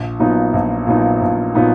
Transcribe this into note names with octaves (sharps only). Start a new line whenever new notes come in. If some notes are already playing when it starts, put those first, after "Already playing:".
Already playing: A#1
A#2 F#3 B3 D#4
A#1
A#2 F#3 B3 D#4
A#1
A#2 F#3 B3 D#4